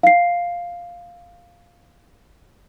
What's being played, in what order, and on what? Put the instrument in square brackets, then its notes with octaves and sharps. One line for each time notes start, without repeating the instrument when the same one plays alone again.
[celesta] F5 C7